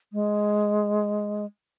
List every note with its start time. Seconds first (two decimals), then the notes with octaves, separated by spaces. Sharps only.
0.13 G#3